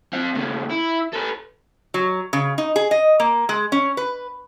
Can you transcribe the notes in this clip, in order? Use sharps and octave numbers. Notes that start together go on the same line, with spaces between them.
C4 F4
D#2 C#3
E4
A4 B4
F#3
C#3
D#4
G#4
D#5
A#3
G#3
C#4
B4